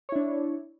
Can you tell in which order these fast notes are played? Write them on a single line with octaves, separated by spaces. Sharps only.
C#5 E4 D4